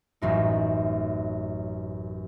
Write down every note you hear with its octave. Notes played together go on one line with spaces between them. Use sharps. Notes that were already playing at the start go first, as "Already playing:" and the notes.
A1 F#2 D#4